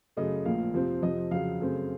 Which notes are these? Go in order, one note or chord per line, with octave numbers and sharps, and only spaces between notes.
F#2 C#3 A3 D#5
A#1 A2 F3 A#3 F5
F2 C3 F3 C4
F2 C3 F3 D#5
F2 C#3 F#3 F5
F#2 C#3 A3 C4